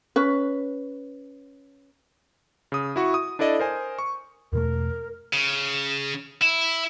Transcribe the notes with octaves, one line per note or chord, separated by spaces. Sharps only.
C#4 B4
C#3 D#6
E4 F#4 C#6
D#6
D4 E4 A4 D5 D#5
A#4 C5 G#5
C#6
E2 B2 A3 A#4
C#3
E4